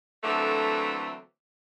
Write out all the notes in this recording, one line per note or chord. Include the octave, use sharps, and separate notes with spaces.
D3 E3 F#3 A3 A#3 C4